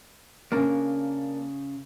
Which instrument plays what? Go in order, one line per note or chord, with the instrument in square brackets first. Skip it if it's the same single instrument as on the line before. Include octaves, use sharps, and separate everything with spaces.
[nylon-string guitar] C#3 C#4 [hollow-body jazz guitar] A#3 D4 A#4